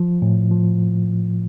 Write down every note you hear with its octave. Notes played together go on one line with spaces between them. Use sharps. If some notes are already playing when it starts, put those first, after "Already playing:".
Already playing: F3
A2
F3